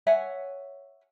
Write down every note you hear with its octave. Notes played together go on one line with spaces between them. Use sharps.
C#5 E5 F#5 G#5